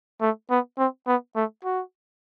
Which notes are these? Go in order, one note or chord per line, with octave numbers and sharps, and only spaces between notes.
A3
B3
C4
B3
A3
F#4